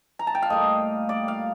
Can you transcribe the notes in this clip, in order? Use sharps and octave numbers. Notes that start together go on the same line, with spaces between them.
A#5
A5
G5
F5
A2 G3 A#3 D#5
D5
F5